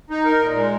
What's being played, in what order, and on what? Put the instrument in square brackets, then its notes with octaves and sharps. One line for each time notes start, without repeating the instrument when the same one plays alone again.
[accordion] D#4
A#4
A#2
G#3